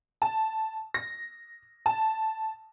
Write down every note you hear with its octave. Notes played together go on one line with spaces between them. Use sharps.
A5
A#6
A5